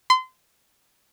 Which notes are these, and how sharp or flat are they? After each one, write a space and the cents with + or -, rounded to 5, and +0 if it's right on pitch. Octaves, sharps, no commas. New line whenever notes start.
C6 -30